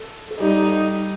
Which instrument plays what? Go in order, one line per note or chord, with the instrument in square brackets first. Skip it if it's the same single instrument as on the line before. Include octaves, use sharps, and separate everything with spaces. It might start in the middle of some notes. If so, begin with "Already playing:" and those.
Already playing: [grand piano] A4
A4
[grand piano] G3 G4 [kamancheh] D#4